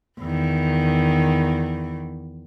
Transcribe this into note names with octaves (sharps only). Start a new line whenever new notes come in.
E2 D#3